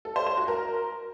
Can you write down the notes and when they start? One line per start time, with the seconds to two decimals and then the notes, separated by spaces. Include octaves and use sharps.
0.05 A4
0.16 C5
0.27 C5
0.37 F#4
0.48 A#4